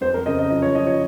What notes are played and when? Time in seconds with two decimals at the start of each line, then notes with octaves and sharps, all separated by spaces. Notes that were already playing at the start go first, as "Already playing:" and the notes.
0.01 F2 C5
0.14 A#4
0.26 C#3 D#5
0.39 D#5
0.50 F3 D#5
0.62 C#5
0.75 F3 D#5
0.87 C#5